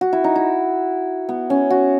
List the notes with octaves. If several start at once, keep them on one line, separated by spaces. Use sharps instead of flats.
F#4
E4
D#4
E4
B3
C#4
F#4